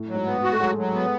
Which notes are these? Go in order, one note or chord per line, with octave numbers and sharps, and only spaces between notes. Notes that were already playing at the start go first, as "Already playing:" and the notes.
Already playing: A2
F#3
G#2
B3
F#4
A3
F#3 G#3
F#3
B3